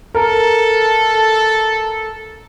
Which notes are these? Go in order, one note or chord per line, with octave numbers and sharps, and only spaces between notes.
A4 A#4